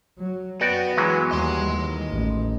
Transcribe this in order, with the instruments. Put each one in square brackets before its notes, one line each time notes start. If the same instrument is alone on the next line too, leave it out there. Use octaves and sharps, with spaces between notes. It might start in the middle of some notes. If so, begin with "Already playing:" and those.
[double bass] F#3
[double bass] F#2 [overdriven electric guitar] B3 [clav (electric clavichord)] F#4 D5 G5
[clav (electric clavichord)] E3 F#3 G#3
[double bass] D#2 G3 [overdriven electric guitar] D#5 C6
[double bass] D#3
A1